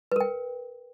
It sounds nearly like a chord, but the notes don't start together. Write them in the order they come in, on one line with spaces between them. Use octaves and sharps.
B4 A#4 G5